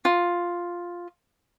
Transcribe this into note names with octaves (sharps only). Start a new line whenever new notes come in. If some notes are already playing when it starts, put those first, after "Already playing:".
F4